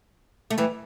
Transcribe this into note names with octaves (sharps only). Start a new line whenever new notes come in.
A3
E3 G3